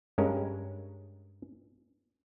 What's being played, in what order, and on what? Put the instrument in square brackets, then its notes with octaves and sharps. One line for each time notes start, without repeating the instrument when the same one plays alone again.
[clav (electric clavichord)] G2 G#3 C#4 A#4